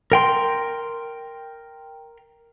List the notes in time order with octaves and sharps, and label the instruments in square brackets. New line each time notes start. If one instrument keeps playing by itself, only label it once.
[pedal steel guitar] A#4 G5 C6